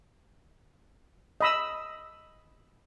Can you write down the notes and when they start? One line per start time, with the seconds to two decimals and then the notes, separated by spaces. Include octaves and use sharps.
1.41 D#5 B5 E6